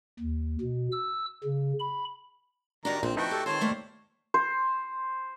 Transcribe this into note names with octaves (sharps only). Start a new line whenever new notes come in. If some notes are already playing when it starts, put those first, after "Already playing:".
D#2
B2
E6
C#3
B5
D#3 D4 F#4 G4 A#5
A#1 F2 D3 C4
A3 D#4 E4 F#4 B4 G5
G4 A4
D#3 B3 C4 F4 C5 C#5 A5
G3 A3 A#3
C5